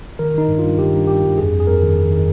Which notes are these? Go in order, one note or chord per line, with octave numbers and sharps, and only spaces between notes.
D#3 A#4
D#3 D#4
G2
F4
G2
D#3 G4
G2
G2 G4
G2
F2 G#4
F2
G#4
F2 A#4
D#3
D#3
D#3